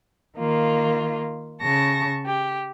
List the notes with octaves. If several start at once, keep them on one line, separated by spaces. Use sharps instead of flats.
D#3 A#3 F4
C#3 A5 C#6 A#6
G4